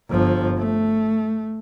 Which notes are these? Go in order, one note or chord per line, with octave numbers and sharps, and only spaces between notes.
G1 F3
A3